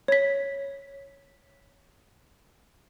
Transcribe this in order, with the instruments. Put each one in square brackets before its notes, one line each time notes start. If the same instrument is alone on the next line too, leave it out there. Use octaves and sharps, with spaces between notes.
[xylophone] C#5 B6